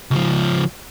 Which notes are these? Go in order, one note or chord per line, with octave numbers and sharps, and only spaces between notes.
C#2 F3